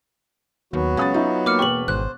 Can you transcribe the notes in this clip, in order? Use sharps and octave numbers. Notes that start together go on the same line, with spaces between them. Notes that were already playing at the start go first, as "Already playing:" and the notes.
D#2 F#3 B3 F#4
C#2 C#4 D#6 A6
D#4 F4 E5
A#3 D6 F6 C#7
E1 B4 G5 C#6 F#7
G#1 C5 F#6